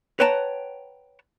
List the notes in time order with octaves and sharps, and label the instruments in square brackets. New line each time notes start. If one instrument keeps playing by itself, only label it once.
[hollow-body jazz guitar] B4 C#5 F#5 G5 A5 A#5